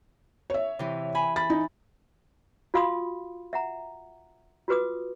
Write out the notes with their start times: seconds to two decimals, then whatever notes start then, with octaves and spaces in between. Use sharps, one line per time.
0.50 C#5 E5
0.79 C3 E3
1.15 G#5 B5
1.36 B5 A6
1.50 D#4
2.74 F4 F#4 F5 B5 C6 D#6
3.53 E5 F#5 A#5
4.68 F4 F#4 B4 D6 D#6